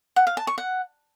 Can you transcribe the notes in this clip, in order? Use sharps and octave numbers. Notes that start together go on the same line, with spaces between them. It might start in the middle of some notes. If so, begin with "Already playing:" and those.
F#5
F5
A5
C#6
F#5